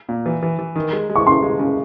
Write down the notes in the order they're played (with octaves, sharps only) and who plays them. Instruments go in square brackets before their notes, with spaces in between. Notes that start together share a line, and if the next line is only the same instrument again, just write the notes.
[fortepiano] A#2
E3
E3
E3
D#3
G#3
G#3
[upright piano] C#6
[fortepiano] C#3 [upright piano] C6
[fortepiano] G#3
C#3